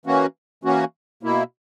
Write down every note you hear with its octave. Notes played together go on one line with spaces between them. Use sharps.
E3 A#3 C#4 F#4
E3 A#3 C#4 F#4
B2 A#3 E4